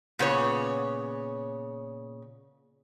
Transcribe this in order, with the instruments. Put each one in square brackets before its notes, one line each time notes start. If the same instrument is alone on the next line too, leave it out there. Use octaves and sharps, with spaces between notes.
[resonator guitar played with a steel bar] A#2 C#3 B3 C#5